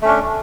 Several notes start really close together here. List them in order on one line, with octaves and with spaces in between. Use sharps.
A3 C#4 D4